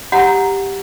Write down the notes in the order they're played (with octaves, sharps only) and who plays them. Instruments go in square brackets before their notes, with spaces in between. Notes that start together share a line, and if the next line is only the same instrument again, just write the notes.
[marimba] G4 A#5 [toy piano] F#5